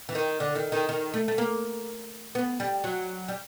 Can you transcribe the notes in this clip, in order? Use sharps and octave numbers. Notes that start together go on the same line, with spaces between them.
E3
D#3
D3
D#3
D#3
D#3
A3
A3
A#3
B3
G3
F#3
G3